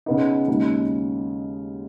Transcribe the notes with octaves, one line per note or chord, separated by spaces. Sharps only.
C#3 B3 D#4
D#2 C#3 G#3 D#4